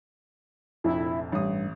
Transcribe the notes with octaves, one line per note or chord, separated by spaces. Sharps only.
F1 A#1 F2 E4
A1 G2 D#6